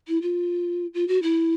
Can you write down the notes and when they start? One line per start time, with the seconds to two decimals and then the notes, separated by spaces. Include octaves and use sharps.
0.08 E4
0.22 F4
0.94 F4
1.08 F#4
1.23 E4